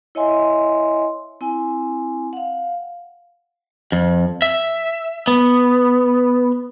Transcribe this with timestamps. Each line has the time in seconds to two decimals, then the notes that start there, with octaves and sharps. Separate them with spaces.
0.15 E4 C#5 D#5 E5 G#5 C6
1.41 C4 E4 G#5
2.33 F5 F#5
3.92 F2
4.42 E5
5.27 B3